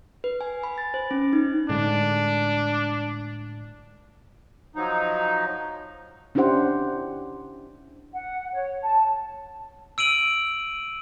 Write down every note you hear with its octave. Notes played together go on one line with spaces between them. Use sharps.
B4
G#5
B5
A6
C5
C#4
D#4
A2 D3 G#3 D4
F3 F#3 D#4
C#4 D4 E4 G4 C5 F#5
F#5
C#5
A5
E6 D7 D#7 F#7